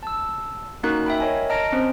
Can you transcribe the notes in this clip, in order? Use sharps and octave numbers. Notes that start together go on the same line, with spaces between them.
A5 E6
A#3 C#4 D#4 F#4 A#4 F#6
E5 G5 B5
A#4 C#5 D#5 G#5
D#5 A5 A#5 F6 A#6 D7
C4 C#4 C5